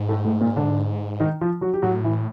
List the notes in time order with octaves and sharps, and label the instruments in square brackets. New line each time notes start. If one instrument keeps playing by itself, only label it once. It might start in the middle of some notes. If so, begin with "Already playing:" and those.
Already playing: [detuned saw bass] G#2
[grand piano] A2 A3
A2 A3
A#2 A#3
D3 D4
D#3 D#4
F3 F4
F#3 F#4
G4
[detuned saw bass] A2 [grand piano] F#3 F#4
[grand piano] E3 E4